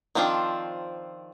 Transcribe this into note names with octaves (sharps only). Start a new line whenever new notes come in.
D#3 F3 C4 D4 F4